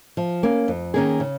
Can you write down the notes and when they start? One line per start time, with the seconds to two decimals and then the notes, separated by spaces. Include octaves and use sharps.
0.17 F3
0.43 A#3 C#4
0.68 F2
0.94 D#3 A#3 C#4 G#4
1.20 C#3